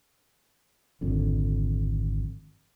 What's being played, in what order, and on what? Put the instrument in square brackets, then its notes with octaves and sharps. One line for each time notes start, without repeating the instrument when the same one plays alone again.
[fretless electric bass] G#1 F2 D3